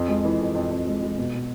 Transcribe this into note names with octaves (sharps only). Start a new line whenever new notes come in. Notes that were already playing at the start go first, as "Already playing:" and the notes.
Already playing: F2 F3
G#3
E3
F2
F2
F2
G#3
G#3
B2
B2